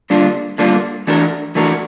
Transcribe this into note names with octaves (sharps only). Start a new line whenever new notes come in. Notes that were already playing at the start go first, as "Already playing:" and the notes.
D3 G3 A#3 D4 F4
D3 G3 A#3 D4 F4
E3 A3 D4 F#4 A#4
E3 A3 D4 F#4 A#4